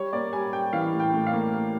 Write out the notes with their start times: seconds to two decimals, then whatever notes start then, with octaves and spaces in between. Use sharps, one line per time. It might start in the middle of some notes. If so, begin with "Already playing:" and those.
Already playing: G3 C#5
0.13 A#3 D5
0.33 G3 G#5
0.53 G3 G5
0.73 E3 F5
0.93 A2
1.00 G5
1.13 A2
1.27 F5
1.33 A#3
1.53 A#3